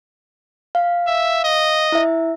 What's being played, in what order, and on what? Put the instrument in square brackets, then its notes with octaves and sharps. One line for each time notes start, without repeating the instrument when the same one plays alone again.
[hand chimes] F5
[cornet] E5
D#5
[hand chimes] E4 E5